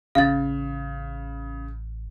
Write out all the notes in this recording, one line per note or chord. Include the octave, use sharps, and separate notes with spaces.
A1 C#3 F5 A6